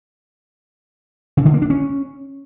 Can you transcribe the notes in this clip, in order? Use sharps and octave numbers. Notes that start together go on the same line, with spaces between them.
C#3
D3
A#3
D4
C#4